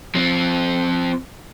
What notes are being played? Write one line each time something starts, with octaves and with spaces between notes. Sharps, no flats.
F3 C4